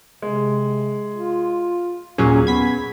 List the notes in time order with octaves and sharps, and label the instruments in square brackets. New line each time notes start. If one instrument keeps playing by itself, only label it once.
[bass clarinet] C3 [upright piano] G#3
[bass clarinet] F4
[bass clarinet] D#2 [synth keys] A#2 F#3 C#4 [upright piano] G#4
[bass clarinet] B3 [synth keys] G#6 B6